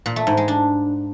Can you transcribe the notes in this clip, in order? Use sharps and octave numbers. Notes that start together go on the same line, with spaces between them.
A#2
A3
G#2
G#3
D4